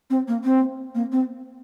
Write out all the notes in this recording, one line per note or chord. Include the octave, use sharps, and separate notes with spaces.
C4
A#3
C4
A#3
C4